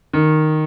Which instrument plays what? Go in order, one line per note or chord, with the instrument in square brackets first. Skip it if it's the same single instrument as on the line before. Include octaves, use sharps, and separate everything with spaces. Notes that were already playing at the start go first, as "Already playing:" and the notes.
[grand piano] D#3